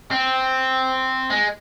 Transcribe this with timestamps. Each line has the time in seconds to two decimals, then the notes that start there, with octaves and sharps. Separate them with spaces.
0.11 C4
1.30 G#3